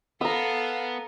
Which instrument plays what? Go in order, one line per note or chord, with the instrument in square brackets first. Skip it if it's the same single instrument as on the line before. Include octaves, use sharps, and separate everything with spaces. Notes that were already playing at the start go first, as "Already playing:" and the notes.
[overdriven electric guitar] B3 [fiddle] A4 F5 [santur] A#5 E6